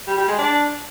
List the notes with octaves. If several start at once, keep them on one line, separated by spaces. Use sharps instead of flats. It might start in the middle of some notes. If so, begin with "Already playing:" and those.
G3
G3
G#3
D4